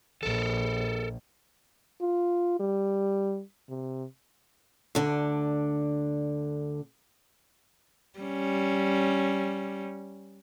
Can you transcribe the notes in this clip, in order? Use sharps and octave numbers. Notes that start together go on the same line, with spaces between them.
A#1 A4 A#4
F4
G3
C3
D2 D3 D5
G3 C#4